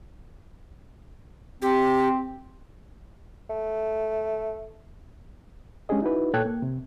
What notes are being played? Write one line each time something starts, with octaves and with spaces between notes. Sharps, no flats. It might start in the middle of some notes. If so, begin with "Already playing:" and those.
C4 G4
A3
G#3 C#4 D4 G4 G#4 D#5
D#4 E4 F#4 B4
A#2 A4 C#5 G5 F#6 G#6
A#3
C3